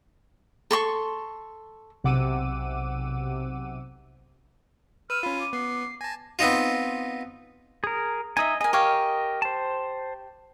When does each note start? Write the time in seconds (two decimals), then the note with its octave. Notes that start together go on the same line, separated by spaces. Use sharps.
0.71 A4 C6 C#6
2.04 B1 C3 F#5 D6 E6 D#7
5.10 B4 E6 F6 D#7
5.23 C#4 F4 B5
5.40 D6
5.53 B3 C7
6.01 G#5 A5 A#6
6.39 B3 C4 D#4 F4
7.84 G#4 A#4
8.37 D#4 D#5 E5 G#5
8.61 G#4 A#4 D#5 G#5
8.73 G4 C#5 F5
9.42 C5 A5